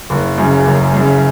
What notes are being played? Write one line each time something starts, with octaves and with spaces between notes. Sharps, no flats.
F#1
F#2 C#3
F#1
F#2
C#3